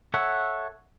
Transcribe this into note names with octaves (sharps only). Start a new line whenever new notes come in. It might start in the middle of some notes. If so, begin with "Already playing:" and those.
A4 C#5 E5 F#5